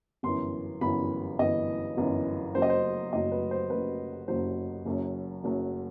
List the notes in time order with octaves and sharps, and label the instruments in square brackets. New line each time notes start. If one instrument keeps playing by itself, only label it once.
[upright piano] G1 F#2 E3 C6
G1 F#2 E3 B5
G1 F#2 E3 D#5
G1 F#2 E3
F#1 F#2 F#3 C5
D#5
C5
F#1 F#2 F#3 D#5
B4
C5
F#1 F#2 F#3 B4
F#1 F#2 F#3 C5
F#1 F#2 F#3
F#1 F#2 F#3